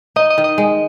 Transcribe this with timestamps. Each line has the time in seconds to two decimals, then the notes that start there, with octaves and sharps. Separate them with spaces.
0.16 D#4 D#5
0.30 D#5
0.38 D#3
0.44 D#5
0.58 G#3